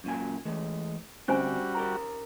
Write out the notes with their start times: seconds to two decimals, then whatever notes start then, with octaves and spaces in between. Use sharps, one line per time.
0.04 F#2 A#2 G#5
0.45 E3 G#3 A3
1.28 D2 G3 A3 C4 C#4 F#4 C5 G#5
1.75 G4 A#4 A#5